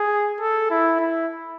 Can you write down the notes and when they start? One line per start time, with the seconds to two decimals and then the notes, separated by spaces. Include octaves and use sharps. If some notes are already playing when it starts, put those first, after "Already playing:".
Already playing: G#4
0.40 A4
0.70 E4
1.00 E4